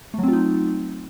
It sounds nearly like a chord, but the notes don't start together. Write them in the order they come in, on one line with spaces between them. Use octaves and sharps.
A3 F#3 C4 F4 D#4